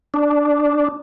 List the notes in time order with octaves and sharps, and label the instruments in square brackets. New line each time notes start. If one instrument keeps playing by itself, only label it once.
[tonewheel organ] D4